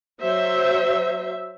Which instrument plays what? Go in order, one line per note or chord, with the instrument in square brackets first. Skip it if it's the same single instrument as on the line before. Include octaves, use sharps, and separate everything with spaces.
[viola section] F#3 C5 E5